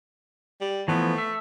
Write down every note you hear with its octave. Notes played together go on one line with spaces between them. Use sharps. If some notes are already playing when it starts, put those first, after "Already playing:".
G3
E3 F3 A3 B3
E5